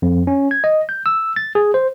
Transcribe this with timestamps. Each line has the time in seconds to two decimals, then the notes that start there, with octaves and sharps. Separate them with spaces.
0.02 F2
0.27 C#4
0.51 G#6
0.64 D#5
0.89 G6
1.06 E6
1.36 A6
1.55 G#4
1.74 C5